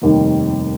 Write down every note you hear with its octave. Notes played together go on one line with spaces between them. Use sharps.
F1 D#2 D#3 G3